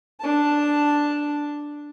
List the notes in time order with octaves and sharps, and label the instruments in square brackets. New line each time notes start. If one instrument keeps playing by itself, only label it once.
[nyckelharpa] D4 A5